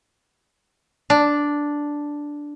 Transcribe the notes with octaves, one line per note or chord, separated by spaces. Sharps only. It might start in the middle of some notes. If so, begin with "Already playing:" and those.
D4